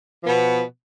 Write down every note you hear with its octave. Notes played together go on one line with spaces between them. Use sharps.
B2 F3 B3